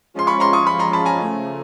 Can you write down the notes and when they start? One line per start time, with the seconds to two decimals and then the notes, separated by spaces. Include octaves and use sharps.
0.14 F3 G#3 C#4 F4 C6
0.27 B5 C#6
0.40 A#5 C6
0.53 C#6 D#6
0.67 B5 C#6
0.79 A#5 C6
0.93 A5 B5
1.06 G#5 A#5
1.19 C#3 F3 A3